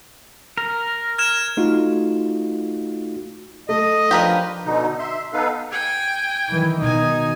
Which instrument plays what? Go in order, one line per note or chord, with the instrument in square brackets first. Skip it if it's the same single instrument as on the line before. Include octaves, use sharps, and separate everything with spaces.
[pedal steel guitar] A#4
[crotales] F6 G#6 E7
[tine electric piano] A3 D#4 F4 F#4
[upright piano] A3 [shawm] D#5
[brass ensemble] F3 D4 F4 [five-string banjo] G4 A#4 B4
[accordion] B2 D3 D#4
E5 C6
B3 D#4 A4 B4 F5
[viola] G5 G#5
[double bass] D#3 E3
[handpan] B2 D#3 [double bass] D#4 [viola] G#5